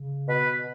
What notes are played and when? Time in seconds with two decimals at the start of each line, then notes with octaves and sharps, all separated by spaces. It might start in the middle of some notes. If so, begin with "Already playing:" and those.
Already playing: C#3
0.28 B2 B4